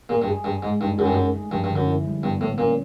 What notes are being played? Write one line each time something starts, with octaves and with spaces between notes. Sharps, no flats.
A#2 G#4
G2
G#4
G2 G#4
G#2 G#3
G2 D#4
F#2 G#4
G2
F#2 A3
A3
G2 F3
G2
D3
F#2
E4
G3
G2 B3
A2 B3
A#2 C#4